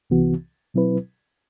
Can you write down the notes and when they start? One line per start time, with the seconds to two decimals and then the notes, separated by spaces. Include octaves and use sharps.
0.10 C2 C3 E3 B3 F#4
0.74 B2 F#3 C4 E4 B4